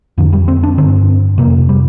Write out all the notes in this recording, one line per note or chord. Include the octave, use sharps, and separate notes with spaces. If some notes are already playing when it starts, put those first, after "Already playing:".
F2 D3 F3
G3
C4
D4
G2 D3 C4
F2 C3 A#3
G3